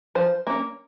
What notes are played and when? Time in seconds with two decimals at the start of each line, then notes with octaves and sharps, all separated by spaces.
0.15 F3 C5
0.47 A#3 C#4